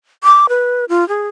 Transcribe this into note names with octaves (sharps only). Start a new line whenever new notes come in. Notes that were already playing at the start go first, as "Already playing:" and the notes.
D6
B4
F4
G#4